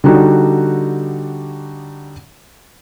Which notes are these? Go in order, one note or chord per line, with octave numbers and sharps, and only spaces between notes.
D3 G3 D#4 F#4